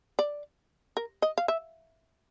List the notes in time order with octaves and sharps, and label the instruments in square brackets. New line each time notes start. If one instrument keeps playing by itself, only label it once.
[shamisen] D5
A#4
D#5
F5
E5